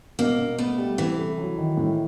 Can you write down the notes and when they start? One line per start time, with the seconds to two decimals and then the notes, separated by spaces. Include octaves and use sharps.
0.19 B2 A#3
0.39 B2
0.59 A3 B3
0.78 G3
0.98 C3 E3
1.18 A3
1.38 F#3
1.57 D#3
1.77 A2